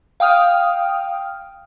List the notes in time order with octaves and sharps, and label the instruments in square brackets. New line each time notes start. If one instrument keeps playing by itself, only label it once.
[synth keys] F5 G5 D#6 F6